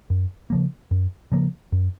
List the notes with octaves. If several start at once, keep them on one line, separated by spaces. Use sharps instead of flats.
F#2
C#3 F3 A#3
F#2
C#3 F3 A#3
F#2